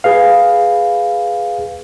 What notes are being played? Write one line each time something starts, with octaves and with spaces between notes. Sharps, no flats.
G#4 B4 F5